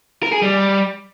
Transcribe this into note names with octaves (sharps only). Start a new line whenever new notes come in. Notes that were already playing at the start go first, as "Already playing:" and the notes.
A#4
G#4
G3